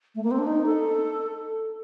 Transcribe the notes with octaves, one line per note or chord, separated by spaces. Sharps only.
A3
A#3
C4
D4
D#4
A4